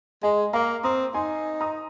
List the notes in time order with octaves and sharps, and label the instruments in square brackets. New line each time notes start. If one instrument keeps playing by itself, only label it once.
[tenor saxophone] G#3 [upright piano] D#5 G#5
[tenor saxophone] A#3 [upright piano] F5 A#5
[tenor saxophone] C4 [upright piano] A#5 D#6
[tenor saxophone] D#4 [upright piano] G#5 C6
[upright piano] A#5 D#6